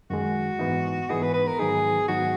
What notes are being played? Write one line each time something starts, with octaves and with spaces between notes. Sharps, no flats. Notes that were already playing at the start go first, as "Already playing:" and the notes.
F#2 D#3 G#3 F#4
G#2 E3 B3 D#4
G#2 E3 B3 D#4 G#4
B4
B4
A#4
G#2 D#3 F#3 B3 D#4 G#4
G#2 D#3 F#3 B3 D#4 F#4